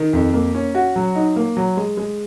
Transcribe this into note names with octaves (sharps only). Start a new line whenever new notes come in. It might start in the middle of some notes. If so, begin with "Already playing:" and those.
Already playing: D#3
F2
A#3
C#4
F#4
F#3
D#4
A#3
F#3
G#3
G#3